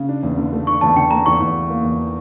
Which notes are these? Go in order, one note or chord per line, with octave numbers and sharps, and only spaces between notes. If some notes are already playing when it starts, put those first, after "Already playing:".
Already playing: C#3
D4
E2
D3
A3
D4 C#6
E2 A5
D3 G5
A3 A#5
E2 C#6
E2
E3
A#3
E2